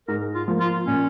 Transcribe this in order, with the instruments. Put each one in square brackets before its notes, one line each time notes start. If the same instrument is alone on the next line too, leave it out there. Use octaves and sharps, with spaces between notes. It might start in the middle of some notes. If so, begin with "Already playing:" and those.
[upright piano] G#2 [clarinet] A#4
[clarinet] F4
[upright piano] F3 A#3
[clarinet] F4
[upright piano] A#2 [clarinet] C#4